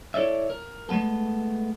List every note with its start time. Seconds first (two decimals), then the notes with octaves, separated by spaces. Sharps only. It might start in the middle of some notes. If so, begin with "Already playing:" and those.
0.14 E4 A4 C#5 D5 E5
0.50 A#4
0.89 G#3 A3 B3 A4